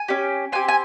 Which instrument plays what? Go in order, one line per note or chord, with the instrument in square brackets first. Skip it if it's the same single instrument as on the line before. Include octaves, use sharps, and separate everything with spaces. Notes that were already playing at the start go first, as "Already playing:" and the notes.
Already playing: [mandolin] G#5
C#4 G4
C4 G4 G#5
G#5